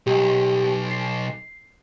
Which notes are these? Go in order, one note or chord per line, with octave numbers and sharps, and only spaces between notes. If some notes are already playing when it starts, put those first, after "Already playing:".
B1 G4
C7